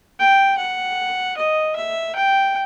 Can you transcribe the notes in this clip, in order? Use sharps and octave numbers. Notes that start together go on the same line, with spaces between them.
G5
F#5
D#5
E5
G5